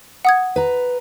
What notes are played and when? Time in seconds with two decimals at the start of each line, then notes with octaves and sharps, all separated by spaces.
0.25 F#5 D#6 G#6
0.56 B4 A#5